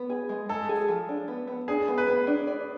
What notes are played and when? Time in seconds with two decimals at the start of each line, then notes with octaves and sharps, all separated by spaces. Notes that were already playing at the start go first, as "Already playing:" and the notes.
Already playing: B3
0.10 G#4
0.29 G#3
0.49 G#3 A4
0.69 G#4
0.88 F3
1.09 D4
1.28 B3
1.48 B3
1.68 D4 G#4
1.88 B3
1.98 B4
2.07 B3
2.27 D4
2.47 D5